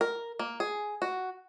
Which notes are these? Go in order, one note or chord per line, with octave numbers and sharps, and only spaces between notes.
A#4
A#3
G#4
F#4